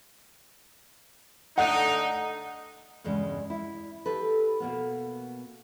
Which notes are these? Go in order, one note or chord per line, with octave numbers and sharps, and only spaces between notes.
D3 A3 D#4 F#5
E2 G2 C#3 G#3
E4
G4 A4 B4
B2 A#3 B3